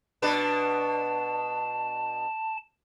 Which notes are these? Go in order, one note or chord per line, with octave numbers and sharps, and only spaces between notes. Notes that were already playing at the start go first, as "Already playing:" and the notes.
B2 D4 B4 A5